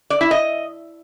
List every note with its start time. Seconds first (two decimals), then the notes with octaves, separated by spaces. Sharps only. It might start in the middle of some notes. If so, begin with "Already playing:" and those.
0.10 D5
0.21 E4
0.31 D#5